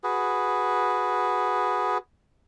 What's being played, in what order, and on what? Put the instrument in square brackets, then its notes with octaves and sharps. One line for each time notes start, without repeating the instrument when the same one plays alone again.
[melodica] F#4 G#4 B4